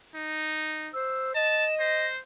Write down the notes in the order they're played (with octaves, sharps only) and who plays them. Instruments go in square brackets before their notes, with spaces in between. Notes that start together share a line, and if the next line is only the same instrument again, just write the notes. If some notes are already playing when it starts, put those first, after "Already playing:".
[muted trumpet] D#4
[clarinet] C5 [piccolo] E6
[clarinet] D#5 [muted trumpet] A5 [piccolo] E7
[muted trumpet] C5 [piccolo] A#6